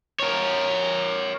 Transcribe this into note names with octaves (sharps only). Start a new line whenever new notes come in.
A#4 C#5